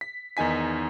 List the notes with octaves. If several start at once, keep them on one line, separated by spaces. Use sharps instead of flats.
B6
E2 D#3 D#4 G#5 B6